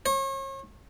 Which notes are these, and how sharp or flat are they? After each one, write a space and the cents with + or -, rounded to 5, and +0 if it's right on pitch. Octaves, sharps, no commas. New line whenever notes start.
C#5 -40